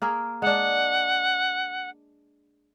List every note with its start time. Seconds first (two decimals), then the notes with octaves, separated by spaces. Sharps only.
0.02 A#3 G#4 A#4
0.42 G#3 D4 F#5